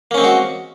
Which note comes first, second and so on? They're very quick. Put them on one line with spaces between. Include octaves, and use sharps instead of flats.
A#3 C#4 C4 G#3 F#4